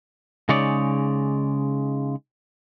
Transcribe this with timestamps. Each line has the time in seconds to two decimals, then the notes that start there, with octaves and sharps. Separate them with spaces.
0.49 C#3 G#3 D#4 C#5 D5